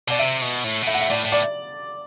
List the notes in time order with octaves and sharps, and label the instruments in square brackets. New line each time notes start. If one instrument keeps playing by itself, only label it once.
[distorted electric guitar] B2 [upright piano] D5
[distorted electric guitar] C3 [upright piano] E5
[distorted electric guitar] B2
A2
B2
[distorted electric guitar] A2 [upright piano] E5
[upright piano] F#5
E5
[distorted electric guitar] A2 [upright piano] D5
[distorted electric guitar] A2
[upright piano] D5